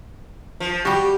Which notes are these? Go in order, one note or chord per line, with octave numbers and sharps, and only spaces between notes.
F3
G3 F#4 G4